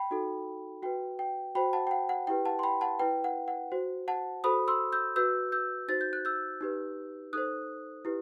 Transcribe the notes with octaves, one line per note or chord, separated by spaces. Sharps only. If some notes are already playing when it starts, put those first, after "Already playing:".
Already playing: G5 B5
D#4 F#4 A4
F#4 B4 G5
G5
F#4 C5 G5 B5
F#5 A5
G5
F#5
F#5
E4 G4 B4 G5
F#5 A5
C6
G5 B5
F#5 A5
E4 B4 G5
F#5
F#5
F#4 C5
F#5 A5
F#4 A4 C5 B5 D#6
C6 E6
E6 G6
F#4 B4 E6 G6
E6 G6
D#4 F#4 C5 A6
G6
F#6
E6 G6
D#4 G4 B4
D#4 A4 C5 D#6 F#6
E4 G4 B4